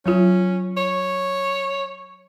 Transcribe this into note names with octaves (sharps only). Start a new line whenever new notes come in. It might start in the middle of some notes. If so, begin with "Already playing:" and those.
F#3 C#4 F4
C#5